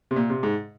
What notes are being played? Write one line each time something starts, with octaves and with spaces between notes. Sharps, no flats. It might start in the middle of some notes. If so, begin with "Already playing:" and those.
C3
A#2
C3
G#2